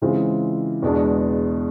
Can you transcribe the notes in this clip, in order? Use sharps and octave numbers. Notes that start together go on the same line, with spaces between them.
C#3 E3 G#3 C4 F4
E2 B2 G#3 B3 D4